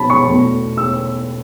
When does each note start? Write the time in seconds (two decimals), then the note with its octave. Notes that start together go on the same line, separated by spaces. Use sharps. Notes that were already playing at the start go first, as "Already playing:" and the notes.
Already playing: B2 F#3 A5 B5
0.10 C#6
0.27 E2 B2 A3
0.77 E6